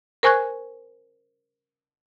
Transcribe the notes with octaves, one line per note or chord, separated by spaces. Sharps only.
A#4 C5 G#5 C#6 F#6 G#6